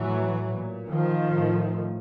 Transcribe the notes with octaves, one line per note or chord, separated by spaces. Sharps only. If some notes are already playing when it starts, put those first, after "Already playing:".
Already playing: A2 E3 F#3
A#2
D#3 F3
A2